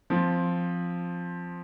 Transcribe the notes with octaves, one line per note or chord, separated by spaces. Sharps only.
F3 C4 F4